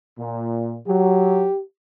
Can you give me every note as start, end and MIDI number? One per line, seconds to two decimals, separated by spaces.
0.19 0.79 46
0.88 1.47 54
0.88 1.61 67